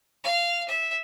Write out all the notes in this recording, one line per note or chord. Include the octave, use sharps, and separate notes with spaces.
F5
E5